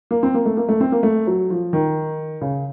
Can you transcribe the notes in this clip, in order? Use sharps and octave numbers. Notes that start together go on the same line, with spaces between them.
A#3
C4
A#3
A3
A#3
A3
C4
A#3
A3
F#3
F3
D#3
C#3